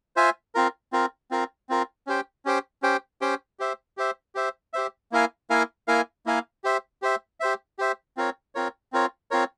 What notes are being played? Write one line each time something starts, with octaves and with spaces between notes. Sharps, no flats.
F4 C5 E5 G#5
C4 F4 A#4
C4 F4 A#4
C4 F4 A#4
C4 F4 A#4
C#4 G4 C5 G5
C#4 G4 C5 G5
C#4 G4 C5 G5
C#4 G4 C5 G5
G4 C5 E5
G4 C5 E5
G4 C5 E5
G4 C5 E5
A#3 E4 A#4 F5 G#5
A#3 E4 A#4 F5 G#5
A#3 E4 A#4 F5 G#5
A#3 E4 A#4 F5 G#5
G4 C5 E5
G4 C5 E5
G4 C5 E5
G4 C5 E5
C4 F4 A#4 C#5
C4 F4 A#4 C#5
C4 F4 A#4 C#5
C4 F4 A#4 C#5